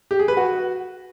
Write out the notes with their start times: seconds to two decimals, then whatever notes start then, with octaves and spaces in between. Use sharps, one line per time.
0.11 G4
0.19 G#4
0.28 B4
0.37 F#4